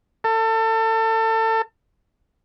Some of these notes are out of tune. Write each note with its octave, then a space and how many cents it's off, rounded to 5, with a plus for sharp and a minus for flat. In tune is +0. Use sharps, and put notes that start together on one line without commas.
A4 +30